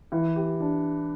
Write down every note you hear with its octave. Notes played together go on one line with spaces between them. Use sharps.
E3
G4
D4